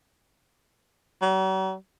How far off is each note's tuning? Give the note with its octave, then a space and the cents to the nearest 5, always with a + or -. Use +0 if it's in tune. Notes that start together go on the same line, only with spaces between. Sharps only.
F#3 +45